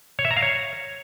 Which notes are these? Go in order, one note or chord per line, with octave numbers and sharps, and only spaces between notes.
C#5
E5
A#5
F5
C#5